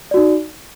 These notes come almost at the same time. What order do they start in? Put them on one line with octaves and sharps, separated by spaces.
D5 F#4 D#4